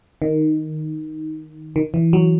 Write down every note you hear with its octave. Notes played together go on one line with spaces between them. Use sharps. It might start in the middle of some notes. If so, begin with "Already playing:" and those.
D#3
D#3
E3
F#3